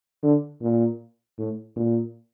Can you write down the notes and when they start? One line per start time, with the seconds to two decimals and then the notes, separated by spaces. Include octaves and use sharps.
0.23 D3
0.61 A#2
1.38 A2
1.76 A#2